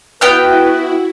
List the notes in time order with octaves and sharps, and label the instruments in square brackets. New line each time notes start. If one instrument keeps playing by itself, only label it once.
[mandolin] B3 G5 F6 [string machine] E4 F#4 [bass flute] B4